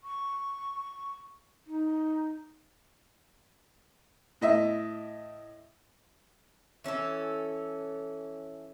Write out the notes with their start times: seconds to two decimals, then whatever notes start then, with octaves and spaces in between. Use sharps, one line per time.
0.03 C#6
1.67 D#4
4.41 A2 D#5 E5
6.84 E3 C#4 D#4 A4